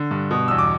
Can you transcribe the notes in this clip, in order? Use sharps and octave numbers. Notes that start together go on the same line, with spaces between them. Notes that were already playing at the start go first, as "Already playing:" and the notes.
Already playing: D3
G2
B2
E2 E6
D6